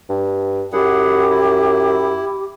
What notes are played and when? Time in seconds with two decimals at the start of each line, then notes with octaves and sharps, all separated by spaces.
0.09 G2
0.73 F#2 E4 G4 G#4 F#5
1.30 E4